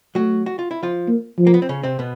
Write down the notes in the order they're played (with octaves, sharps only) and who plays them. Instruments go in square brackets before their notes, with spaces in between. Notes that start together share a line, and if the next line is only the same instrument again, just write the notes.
[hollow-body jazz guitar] F#3 F#4 [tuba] A3
[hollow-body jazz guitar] F#4
F4
E4
F3 F4
[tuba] A#3
F3
[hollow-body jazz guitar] A#3
B3
C4
C#3 C#4
C3 C4
B2 B3